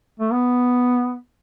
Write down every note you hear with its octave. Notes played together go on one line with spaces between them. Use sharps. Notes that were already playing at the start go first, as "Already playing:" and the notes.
A3
B3